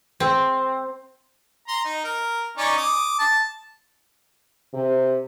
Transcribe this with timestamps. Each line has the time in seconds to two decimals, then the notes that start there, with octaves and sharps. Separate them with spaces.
0.20 C4
1.68 A#5 C6
1.85 D#4
2.04 A#4
2.57 C#4 D#4 D5
2.77 D6 D#6
3.19 A5
4.73 C3